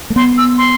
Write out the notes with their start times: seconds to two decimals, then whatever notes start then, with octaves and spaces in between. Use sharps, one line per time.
0.10 A3
0.16 B3 C6
0.38 E6
0.58 C6